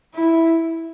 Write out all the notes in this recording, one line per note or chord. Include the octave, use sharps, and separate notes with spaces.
E4